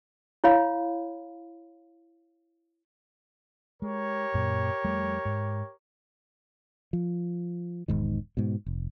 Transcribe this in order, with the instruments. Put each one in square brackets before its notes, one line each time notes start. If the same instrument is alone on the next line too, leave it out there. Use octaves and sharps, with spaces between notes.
[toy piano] E4 C#5 F5 B5
[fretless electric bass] G#3 [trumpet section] G4 A#4 C#5
[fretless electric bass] F#2 A#2
F2 G3 A3
G#2
[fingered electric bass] F3
E1 G#2 D#3
G#2 B2
F1